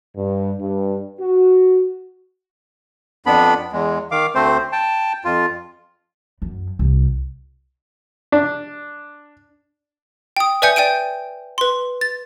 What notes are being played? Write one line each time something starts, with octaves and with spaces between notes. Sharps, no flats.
G2
G2
F#4
F2 B3 D4 B5
E2 G#3
D#3 F5 D6
D2 A3 C4 C5
G5 A5
F2 F4
F#2
C2
D4
G5 D#6
B4 D5 E5 G#5 G6 C#7
D5 G5 G6 D7 D#7
B4 C6
A6